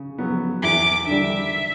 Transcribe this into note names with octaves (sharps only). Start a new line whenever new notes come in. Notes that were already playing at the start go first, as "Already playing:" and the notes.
Already playing: C#3
F#3 B3
E2 D6
D3 G3 E5